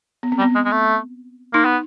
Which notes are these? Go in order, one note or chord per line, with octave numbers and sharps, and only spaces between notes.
B3
C4
G3
B3
G#3
G#3
A3
A#3 D#4
B3